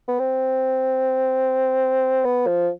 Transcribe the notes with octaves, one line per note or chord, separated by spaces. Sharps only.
B3
C4
B3
F3